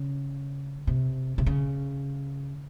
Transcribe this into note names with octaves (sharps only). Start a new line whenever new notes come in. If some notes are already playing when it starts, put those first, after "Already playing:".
Already playing: C#3
C3
C3
C#3